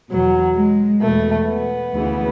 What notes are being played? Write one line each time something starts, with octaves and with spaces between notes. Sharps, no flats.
E2 B2 F#3
G#3
E2 B2 A3
B3
D2 C#3 E3